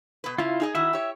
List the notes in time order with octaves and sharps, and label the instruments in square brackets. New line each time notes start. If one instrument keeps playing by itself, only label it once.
[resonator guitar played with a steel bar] B2 B4
[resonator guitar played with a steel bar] C#3 C#4 [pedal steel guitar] E4 F4
[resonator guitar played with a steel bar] D#4 G#4 D#5
[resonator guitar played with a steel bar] D#3 E4 F#4 [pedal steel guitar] E5
[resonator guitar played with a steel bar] G4 C#5